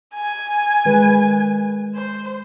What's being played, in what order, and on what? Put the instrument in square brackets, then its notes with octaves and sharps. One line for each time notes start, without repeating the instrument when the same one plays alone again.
[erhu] G#5
[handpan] D#3 G#3 B4
[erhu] C5